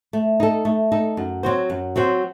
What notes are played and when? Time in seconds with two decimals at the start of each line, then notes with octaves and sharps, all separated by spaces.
0.13 A3
0.40 D#4 A4
0.65 A3
0.92 D#4 A4
1.17 F#2
1.43 F#3 C4 F#4 C5
1.70 F#2
1.96 F#3 C4 F#4 C5